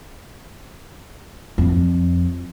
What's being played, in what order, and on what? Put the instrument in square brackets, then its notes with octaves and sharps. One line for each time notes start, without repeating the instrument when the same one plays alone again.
[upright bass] F2